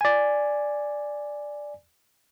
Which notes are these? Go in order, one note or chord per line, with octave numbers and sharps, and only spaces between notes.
D5 G#5